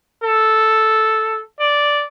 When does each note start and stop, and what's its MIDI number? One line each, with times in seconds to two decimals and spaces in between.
0.24 1.42 69
1.60 2.05 74